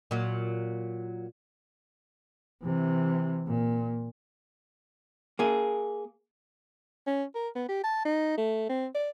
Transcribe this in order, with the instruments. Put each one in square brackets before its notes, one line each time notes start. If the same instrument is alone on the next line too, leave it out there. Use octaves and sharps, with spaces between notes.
[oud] A#2 F#3
[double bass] C3 E3
A#2
[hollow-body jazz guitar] A#3 G#4
[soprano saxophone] C#4
A#4
B3
G4
A5
D#4
A3
C4
D5